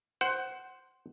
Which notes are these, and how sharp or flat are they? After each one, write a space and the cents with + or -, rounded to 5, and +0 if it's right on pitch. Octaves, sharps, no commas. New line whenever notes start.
C5 +0 F#5 +20